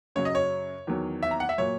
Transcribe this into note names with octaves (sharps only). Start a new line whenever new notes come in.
F#2 C#3 F#3 C#5
D#5
C#5
E2 D#3 F#3
E5
A#5
F#5
E5
A#2 F#3 C#5